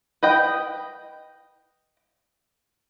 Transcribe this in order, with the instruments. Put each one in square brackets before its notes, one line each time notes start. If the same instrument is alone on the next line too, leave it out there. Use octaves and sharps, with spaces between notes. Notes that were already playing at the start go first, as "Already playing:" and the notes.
[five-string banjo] B4 D#5 G5